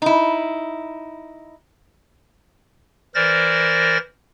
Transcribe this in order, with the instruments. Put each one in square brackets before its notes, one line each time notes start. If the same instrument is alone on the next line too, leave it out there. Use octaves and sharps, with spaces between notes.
[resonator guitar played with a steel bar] D#4 E4
[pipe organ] E3 A#4 C5 D5 A6 A#6